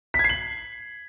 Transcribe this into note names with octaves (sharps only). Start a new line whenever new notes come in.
B6
G#6
C7
F#7